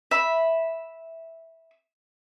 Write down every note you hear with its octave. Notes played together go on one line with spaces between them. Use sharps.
E5 B5